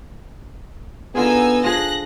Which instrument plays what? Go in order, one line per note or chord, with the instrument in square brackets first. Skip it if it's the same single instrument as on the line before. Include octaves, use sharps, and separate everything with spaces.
[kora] D3 F4 G#4 [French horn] B3 [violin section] D#4 G#5 E6
[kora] F3 G#4 [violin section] F#6 A#6